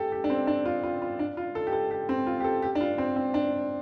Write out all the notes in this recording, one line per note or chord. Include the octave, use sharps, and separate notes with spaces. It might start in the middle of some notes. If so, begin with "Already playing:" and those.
Already playing: G4 A4
G4
D4
C4
D4
F4
F4
F4
D4
F4
A4
G4
A4
G4
C4
F4
G4
A4
G4
D4
F4
C4
C4
D4